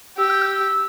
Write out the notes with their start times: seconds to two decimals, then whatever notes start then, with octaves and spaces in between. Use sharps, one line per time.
0.18 G4 E6
0.30 G6
0.42 E6